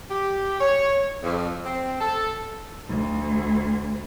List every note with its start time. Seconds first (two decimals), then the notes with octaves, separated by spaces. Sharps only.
0.10 G4
0.60 C#5
1.23 F2
1.65 C4
2.00 A4
2.89 D2